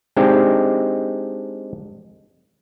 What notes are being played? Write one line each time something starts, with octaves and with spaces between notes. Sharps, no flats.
G#3 C4 D4 D#4 G4